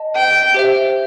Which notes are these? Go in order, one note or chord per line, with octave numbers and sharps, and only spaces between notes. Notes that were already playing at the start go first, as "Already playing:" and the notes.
Already playing: D#5 A5
G5
G4 C5 E5